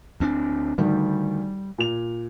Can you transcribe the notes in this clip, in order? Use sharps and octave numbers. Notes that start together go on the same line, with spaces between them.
D2 C4 D4
D2 D#3 G3
A#2 F7